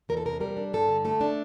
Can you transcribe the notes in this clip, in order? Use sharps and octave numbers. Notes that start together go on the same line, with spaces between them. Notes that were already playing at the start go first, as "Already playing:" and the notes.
E2 A#4
A4
C3 A#4
G3 A#4
D4
G2 A4
D3
A3 A4
D4